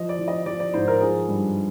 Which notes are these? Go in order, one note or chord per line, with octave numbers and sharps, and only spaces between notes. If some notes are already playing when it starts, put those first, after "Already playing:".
Already playing: F3 D#5
D5
F3
D#5
F3 D5
D5
G#2 C5
A#4
F3 G#4
G2